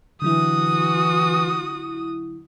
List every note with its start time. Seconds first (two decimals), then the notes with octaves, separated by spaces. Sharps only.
0.22 D3 E3 F#3 E4 F#4 D#6